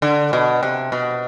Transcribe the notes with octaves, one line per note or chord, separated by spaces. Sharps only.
D3
B2
C3
B2